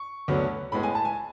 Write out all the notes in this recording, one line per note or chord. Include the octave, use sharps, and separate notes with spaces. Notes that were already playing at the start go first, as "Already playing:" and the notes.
Already playing: C#6
D2 D3 F#3 B3
A2 G#3 B3 B5
G#5
A5
G#5